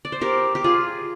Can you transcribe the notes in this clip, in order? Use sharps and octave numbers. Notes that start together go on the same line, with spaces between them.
D5
C5
G4 A#4
G4
F4 G#4